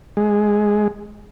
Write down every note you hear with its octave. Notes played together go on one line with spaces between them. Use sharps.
G#3